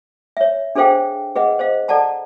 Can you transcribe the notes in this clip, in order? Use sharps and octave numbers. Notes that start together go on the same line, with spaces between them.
C#5 E5
D4 G#4 A4 C5 F5 G5
G#4 B4 D#5 F#5
C5 D#5 F5
A4 D5 F#5 A5 A#5